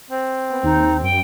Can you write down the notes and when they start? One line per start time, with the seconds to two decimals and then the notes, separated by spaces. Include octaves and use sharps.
0.10 C4
0.50 B3
0.63 D#2 D#4
1.03 F#2 G5